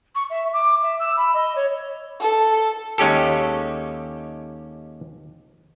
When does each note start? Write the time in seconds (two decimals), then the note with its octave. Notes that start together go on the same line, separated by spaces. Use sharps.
0.15 C#6
0.30 E5
0.53 D6
0.82 E5
0.99 E6
1.16 B5
1.33 D#5
1.55 C#5
2.20 A4
2.98 D#2 G#3 C#4 G4 A4